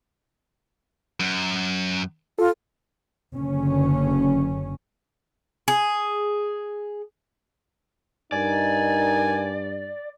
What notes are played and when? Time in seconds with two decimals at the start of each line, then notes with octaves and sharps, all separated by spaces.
1.20 F#2
2.39 F4 A4
3.34 F#1 D3 C#4
5.68 G#4
8.32 G2 D#4 A#4 D5 G#5